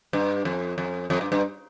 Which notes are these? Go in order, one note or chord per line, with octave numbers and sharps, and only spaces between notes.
G2
F2
F2
F2
G2
G2